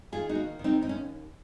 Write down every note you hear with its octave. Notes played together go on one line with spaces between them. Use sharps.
D#3 F4 G#4
D#4 F#4
A#3
D#3
C4 D#4
D#2 D#4
C#4